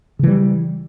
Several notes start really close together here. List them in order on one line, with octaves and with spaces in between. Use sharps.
C#3 E3 G3